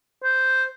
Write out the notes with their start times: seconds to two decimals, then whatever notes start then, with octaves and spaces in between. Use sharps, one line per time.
0.24 C5